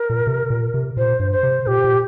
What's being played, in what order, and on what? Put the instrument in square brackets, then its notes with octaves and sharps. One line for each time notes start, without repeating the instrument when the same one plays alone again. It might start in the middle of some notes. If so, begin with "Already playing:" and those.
Already playing: [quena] A#4
[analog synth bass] A#2
C3
A#2
C3
[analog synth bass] A#2 [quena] C5
[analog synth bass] G2
[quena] C5
[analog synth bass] C3
[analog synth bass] A#2 [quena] G4
[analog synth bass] A#2